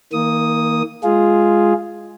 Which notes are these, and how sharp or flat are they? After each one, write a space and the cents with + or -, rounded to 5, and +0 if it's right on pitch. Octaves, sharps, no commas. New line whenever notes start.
D#3 +45 A#3 +0 D#6 +0
G#3 +0 F4 +0 G#4 +0